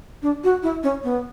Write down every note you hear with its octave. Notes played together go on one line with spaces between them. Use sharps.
D4
F#4
E4
C#4
B3